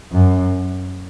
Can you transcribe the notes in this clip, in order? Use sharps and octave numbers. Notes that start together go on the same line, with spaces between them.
F#2